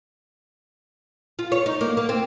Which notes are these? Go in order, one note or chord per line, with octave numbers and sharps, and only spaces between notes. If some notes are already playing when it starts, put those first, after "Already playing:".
F4
C#5
D#4
A#3
A#3
C4